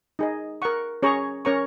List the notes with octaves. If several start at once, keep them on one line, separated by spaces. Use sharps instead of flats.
D#4 G#4 D#5
A#4 F#5 C#6
C#4 G#4 C#5 A#5 C#6
C#4 A#4 C#5 A#5 C#6